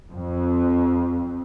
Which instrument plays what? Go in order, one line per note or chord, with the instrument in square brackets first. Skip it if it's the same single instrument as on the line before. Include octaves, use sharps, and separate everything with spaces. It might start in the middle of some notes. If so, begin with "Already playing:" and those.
[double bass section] F2